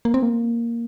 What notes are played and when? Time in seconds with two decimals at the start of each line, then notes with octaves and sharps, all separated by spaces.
0.05 A#3
0.14 C4
0.23 A#3